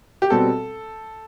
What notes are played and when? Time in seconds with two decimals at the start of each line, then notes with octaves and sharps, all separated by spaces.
0.22 G4
0.30 B2 G3 C4 F#4 A4